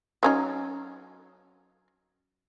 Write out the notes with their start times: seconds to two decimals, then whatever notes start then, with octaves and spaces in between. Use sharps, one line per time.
0.23 F#3 C#4 D#4